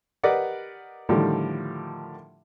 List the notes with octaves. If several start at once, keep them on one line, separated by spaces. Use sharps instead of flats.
G4 A#4 B4 D5 D#5 F#5
A2 D3 D#3 F3 G3